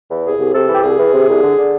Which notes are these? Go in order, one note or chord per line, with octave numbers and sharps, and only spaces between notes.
E2
C2 G#4
C2
C3 A4
E3
G4
C2 G#4
E3
C3
C2
D3
D3